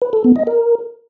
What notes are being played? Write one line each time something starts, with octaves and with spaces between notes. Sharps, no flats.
B4
A4
B3
D#5
A#4